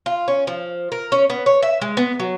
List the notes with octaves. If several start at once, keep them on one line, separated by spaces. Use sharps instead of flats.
F4
C#4
F3
A#4
C#4
B3
C#5
E5
G#3
B3
F#3